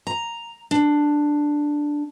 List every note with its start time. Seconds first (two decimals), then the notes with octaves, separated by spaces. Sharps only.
0.07 A#5
0.71 D4